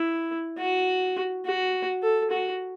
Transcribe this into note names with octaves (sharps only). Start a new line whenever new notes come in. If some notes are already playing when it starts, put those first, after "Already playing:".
Already playing: E4
F#4
F#4
A4
F#4